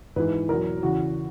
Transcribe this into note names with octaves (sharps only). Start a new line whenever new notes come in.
G#2 E3 B4
E2 B2 F#3 A#4
E2 C#3 E3 F#4